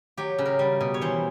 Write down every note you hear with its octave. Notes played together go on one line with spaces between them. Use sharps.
F#3 G4
C#3
A#4
G3
B2
C#5
E3 C5